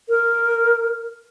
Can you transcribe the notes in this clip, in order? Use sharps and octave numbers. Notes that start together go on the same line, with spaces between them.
A#4